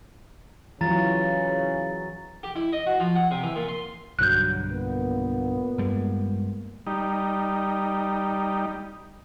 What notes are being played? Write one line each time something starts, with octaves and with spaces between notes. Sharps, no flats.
C#3 E3 F#3 F4 A#5 A6
G4
E4
D#5
F#4
F3
F#5
C3
E3
A#2
C6
B1 G2 D3 F#3 F#6 G6
A#2 A#3 B3
G2 G3 G#3
G3 D#4